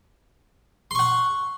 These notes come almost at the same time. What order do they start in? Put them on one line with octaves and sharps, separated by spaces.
C6 C#6 F#5